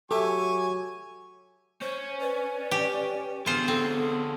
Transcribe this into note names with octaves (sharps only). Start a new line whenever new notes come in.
F#3 G4 A4 E5 G#5 C#6
C#4 C5
B4 D5
G4
D3 B3 F4 G#4 C5
C4 A4